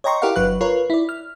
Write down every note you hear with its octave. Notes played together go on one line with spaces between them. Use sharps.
C#5 D#5 G5 A#5 C6 C#6
E4 G4 A#4 D5 F5 F#5
G1 F#3 B4 F#6
F4 A#4 B4 C#5
E4 D5
F6